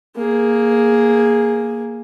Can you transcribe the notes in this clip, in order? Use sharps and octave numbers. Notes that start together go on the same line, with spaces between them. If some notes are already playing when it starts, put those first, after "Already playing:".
A#3 G#4